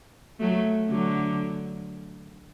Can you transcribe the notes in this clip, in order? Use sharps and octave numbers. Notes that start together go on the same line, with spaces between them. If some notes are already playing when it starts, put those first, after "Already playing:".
F#3 A3
D3 F#3